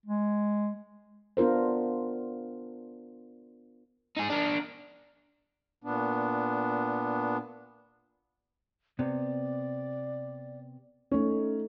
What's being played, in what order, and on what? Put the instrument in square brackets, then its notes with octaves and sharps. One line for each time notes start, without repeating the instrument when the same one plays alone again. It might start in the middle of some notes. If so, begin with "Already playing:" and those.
[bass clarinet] G#3
[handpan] B3 D4 F4 A#4 C5
[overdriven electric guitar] D#4 G#4
D4 A#4
[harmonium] A#2 B3 D4
[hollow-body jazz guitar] C3 B3 [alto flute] D5
[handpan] A3 D#4 [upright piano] C#4